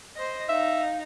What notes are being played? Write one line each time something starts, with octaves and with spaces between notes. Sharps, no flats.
C5 D#5
D#4 E5 F5